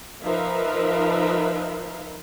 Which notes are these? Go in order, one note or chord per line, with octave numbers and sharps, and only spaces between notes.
F3 D#4 A#4 B4 E5 F5